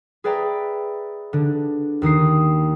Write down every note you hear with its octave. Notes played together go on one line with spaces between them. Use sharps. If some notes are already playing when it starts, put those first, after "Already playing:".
G#4 B4 D5 E5 G5 A#5
D3 D4
D#2 D#3 D#6 C7